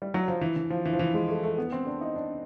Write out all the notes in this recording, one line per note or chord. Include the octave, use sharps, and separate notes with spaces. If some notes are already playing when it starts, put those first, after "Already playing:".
G3
F#3
F3
E3
E3
F3
E3
F3
E3
G#3
A3
A3
B3
C4
D4
D#4
D4